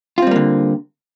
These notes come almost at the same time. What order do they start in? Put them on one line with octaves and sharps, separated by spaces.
F4 C4 G3 A#3 D3